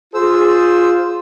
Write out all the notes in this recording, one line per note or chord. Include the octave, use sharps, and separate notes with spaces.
F4 G#4 C5 E6